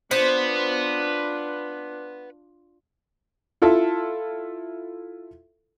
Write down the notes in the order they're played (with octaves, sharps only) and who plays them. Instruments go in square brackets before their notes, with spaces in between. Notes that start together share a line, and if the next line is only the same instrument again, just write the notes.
[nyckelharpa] D4 F4 [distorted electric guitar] B4 F#5 [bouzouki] C5
[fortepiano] E4 F4 A4 E5